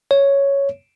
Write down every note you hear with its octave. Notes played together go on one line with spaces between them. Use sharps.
C#5